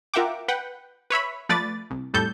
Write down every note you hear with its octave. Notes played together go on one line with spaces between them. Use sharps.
F4 A#4 E5 F#5 G5 D6
B4 F#5 G5
B4 C#5 E5 B5
F3 A3 B4 D5 A6
C2
F2 A2 G3 A4 G6